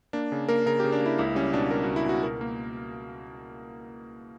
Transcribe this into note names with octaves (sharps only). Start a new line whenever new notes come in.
A#3 D4
C#3
A#3 A#4
C#3 A#4
C#3 G4
D4
A#3
E4
C#2 E4
G3 C#4
B2 D4
G3 A#4
C#2 F#4
E4
B2 F#4
B2 A#4
A#3